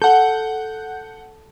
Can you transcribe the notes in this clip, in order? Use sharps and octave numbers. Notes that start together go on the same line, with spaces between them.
A4 F#5 G6